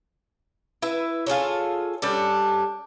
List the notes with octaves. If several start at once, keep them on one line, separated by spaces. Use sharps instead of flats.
E4 B4 E5
F4 G#4 A4 C#5
G3 C#4 D4 A4